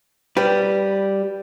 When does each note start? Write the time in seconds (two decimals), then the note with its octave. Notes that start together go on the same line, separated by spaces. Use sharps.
0.37 G3 B4